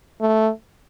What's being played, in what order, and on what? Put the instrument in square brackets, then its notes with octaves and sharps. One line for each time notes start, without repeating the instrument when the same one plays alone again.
[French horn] A3